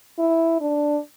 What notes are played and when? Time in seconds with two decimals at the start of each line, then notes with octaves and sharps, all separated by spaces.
0.19 E4
0.61 D4